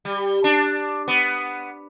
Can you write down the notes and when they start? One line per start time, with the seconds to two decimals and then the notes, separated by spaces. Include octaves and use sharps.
0.05 G3
0.44 D4
1.08 B3